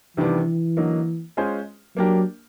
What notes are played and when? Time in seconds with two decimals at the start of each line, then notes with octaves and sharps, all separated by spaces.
0.17 C3 D#3 E3 G3 B3 D4
0.77 D3 F#3 A#3 D#4
1.37 G#3 C#4 F4 G#4 C5
1.97 F#3 A#3 D4 G4 A#4